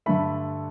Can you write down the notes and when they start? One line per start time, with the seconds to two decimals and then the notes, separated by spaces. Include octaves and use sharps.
0.06 G2 D3 A3 B5